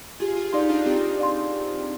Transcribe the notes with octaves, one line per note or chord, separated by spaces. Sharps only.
F4 G4 G#4
F4 G#4
D#4 G4 D5 F5 C6
D4 F4
C4 D#4 G4
D5 F5 C6
G4